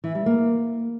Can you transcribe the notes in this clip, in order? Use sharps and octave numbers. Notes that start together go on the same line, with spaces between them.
E3
G3
A#3